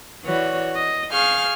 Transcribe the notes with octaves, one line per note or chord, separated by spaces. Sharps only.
E3 F#4 C#5 D5
D#5
G#4 F5 G#5 C#6 F6 G6